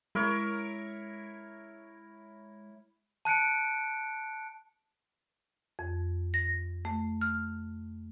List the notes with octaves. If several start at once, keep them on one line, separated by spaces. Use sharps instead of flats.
G#3 E4 A#4 C#5
A5 F#6 C#7 D7
F2
A#6
A3
F6